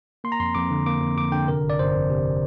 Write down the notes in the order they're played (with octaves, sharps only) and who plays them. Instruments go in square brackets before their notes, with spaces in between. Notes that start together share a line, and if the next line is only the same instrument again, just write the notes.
[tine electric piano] A#3 C6
A#5
F2 C6
F2 D6
D3
A#3 D6
F2
F2 D6
D3 G5
C3 A#4
G1
D5
G1 C5
F2
C3